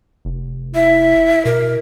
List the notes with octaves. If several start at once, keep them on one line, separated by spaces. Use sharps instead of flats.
F1
E4 E5
B2 A#4